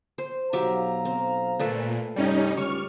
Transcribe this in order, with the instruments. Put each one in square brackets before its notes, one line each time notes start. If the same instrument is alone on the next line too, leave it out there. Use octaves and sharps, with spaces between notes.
[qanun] C5
[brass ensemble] B1 F5 A#5 [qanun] F#3 G4 E5
[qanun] C4
[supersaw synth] A#2 [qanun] A3 A4 B4
[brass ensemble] G2 C3 [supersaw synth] G3 C#4 D#4
[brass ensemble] C#2 C#5 [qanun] G3 [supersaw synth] C#6 F6